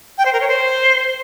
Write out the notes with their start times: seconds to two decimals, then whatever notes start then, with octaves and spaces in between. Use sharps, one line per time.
0.18 G5
0.26 C5
0.33 A#4
0.41 C#5
0.48 C5